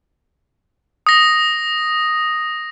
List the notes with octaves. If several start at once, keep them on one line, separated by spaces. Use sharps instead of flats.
D#6 A#6